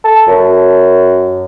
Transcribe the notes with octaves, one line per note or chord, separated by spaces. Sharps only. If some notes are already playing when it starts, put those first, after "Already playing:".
A4
F#2